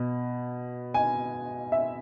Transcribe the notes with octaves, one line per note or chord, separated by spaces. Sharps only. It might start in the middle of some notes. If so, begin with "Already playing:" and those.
Already playing: B2
G#5
E5